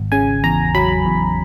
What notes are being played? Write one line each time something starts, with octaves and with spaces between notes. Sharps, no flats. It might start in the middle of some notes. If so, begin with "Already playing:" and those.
Already playing: G#1
C#3 G#5
E2 A#5
F#3 B5
E2